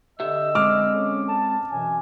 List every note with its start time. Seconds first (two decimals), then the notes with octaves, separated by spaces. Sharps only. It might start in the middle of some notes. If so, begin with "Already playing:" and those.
0.20 D3 G4 D#5 E5 E6
0.55 G#3 C4 D6 F6
0.95 C#4
1.28 A5
1.71 F#2 B2 E3 G#5